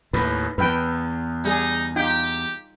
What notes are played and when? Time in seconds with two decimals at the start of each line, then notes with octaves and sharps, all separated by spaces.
0.13 D#2 A2 B4
0.58 E2 B4 G5
1.45 G3 D#4 G#4
1.96 D#4 F4 G4 G5